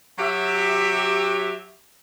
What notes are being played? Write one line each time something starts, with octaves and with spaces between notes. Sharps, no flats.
F#3 G4 E5